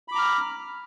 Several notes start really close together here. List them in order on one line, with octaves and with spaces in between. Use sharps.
B5 D6 A#5 F6